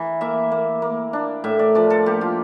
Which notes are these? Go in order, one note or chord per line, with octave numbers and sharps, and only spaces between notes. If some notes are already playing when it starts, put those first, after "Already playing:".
Already playing: E3 A#4
A#3 E5
A#3
A#3
D4
A2 E5
D5
F3 D5
A4
A#3 G4
F4